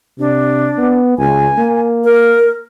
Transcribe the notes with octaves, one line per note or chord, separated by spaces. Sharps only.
C3 D4
B3
C#2 G#5
A#3
A#4